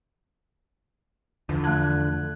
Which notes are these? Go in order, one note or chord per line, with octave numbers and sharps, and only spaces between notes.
E2 D3 F3
A3 A5 F#6 G#6